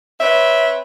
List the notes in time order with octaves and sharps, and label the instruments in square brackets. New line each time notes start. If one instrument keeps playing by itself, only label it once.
[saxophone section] C4 B4 C#5 E5